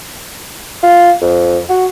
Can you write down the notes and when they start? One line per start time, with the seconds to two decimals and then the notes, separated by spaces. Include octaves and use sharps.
0.83 F4
1.21 F2
1.70 F#4